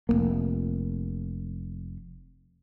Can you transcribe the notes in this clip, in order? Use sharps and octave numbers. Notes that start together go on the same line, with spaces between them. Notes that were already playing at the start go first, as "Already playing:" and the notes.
F1 F#2 A#3